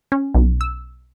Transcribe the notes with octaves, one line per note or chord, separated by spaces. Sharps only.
C#4
B1
E6